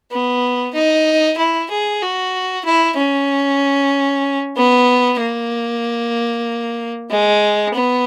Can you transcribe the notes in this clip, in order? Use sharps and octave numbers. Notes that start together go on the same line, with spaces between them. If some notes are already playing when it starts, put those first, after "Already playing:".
B3
D#4
E4
G#4
F#4
E4
C#4
B3
A#3
G#3
B3